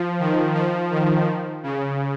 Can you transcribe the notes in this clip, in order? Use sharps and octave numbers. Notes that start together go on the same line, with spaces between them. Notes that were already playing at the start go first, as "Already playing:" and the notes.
Already playing: F3
D#3
F3
D#3
C#3